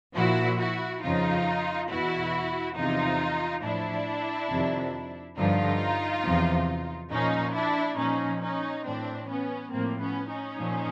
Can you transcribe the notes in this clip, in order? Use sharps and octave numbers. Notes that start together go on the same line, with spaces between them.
A#2 F3 E4 F#4
E4 F#4
F2 C#3 F3 D#4 F4
E2 B2 E4 F#4
E2 C3 F3 D#4 F4
A2 F3 D4 E4
F2 C3 D#3
G2 D3 F3 D#4 F4
E2 C3 F3
A#2 F3 C#4 D#4
D4 E4
A#2 F3 C#4 D#4
C#4 D#4
A2 E3 C4 D4
B3 C#4
A2 F3 A#3 C4
B3 C#4
C#4 D#4
A#2 F3